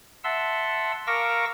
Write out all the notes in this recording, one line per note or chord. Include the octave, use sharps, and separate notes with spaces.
E5 F#5 A5 C6 E6
A#4 F5 C#6 D6 E6 A#6